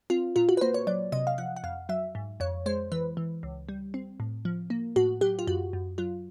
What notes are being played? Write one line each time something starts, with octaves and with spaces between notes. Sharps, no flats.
C4 F4
A#2 F4
F#4
B4
A#3 C5
C#5
F#3 D5
C3 D#5
F5
F3 F#5
F#5
F2 F5
F#3 E5
G#2
F2 C#5
G#3 C5
E3 B4
E3
C#2
G3
C4
A2
F3
A#3
A2 F#4
F#3 G4
F4
F#2 F#4
F#2
F#3 F4